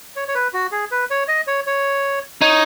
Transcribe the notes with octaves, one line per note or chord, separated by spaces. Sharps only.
C#5
C#5
B4
F#4
G#4
B4
C#5
D#5
C#5
C#5
D#4 C#5